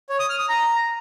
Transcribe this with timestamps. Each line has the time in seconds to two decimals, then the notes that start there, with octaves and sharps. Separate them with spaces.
0.10 C#5
0.19 D#6
0.29 F6
0.39 D#6
0.49 A#5